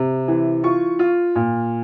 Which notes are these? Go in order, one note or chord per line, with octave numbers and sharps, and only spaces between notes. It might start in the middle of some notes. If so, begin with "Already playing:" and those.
Already playing: C3
E3
F4 C#6
F4
A#2